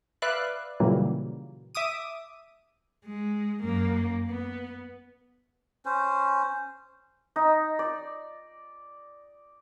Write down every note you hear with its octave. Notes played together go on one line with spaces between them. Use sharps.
B4 D5 E5 F5 F#6
A#2 C#3 E3 F#3 G3 A#3
E5 D6 D#6 D#7
G#3
F#2 A#3
B3
C#4 C5
D#4
D5